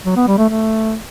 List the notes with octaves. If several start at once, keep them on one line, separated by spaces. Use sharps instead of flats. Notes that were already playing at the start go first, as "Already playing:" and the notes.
F#3
B3
G3
A3
A3